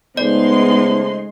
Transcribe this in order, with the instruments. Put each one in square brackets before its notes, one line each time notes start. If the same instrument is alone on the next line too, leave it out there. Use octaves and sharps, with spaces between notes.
[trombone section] C#3 A3 C5 [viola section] G#3 D#4 C6 [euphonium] B3 [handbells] D5